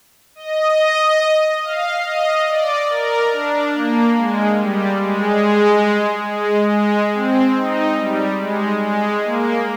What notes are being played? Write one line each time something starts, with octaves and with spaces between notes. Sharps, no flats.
D#5
F5
D#5
D5
A#4
D4
A#3
G#3
G3
G#3
G#3
G#3
C4
D#4
G3
G#3
G#3
A#3